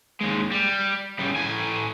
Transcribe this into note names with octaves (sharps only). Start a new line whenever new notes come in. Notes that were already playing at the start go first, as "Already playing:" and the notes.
D#2 G#3
G3
C#3 G3
A2 G#5